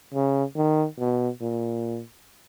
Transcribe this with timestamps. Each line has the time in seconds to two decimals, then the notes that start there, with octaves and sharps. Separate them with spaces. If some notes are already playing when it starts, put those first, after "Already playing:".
0.14 C#3
0.56 D#3
0.99 B2
1.41 A#2